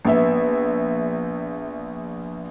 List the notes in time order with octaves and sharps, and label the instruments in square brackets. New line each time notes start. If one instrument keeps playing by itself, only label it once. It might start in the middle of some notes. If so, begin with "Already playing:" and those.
[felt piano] A#1 B3 E5